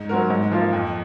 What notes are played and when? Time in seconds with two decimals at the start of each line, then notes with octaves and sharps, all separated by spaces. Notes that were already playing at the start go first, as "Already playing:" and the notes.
Already playing: G#2
0.09 F#3 C4 F#4 A#4
0.30 G#2
0.51 F3 A#3 F4
0.73 F2